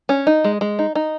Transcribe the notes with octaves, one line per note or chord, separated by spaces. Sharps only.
C#4
D#4
G#3
G#3
D#4
D#4